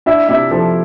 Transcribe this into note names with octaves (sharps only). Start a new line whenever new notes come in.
D4 E4 E5
C3 E4 E5
F3 A4